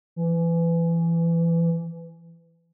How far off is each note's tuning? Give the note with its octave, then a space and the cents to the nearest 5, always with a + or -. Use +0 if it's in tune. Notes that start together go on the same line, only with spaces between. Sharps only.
E3 +25